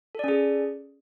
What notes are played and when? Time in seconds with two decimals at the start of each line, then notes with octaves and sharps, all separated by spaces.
0.15 A4
0.19 D5
0.24 C#4
0.28 G#4